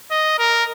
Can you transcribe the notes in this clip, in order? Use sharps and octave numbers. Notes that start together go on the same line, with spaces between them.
D#5
A#4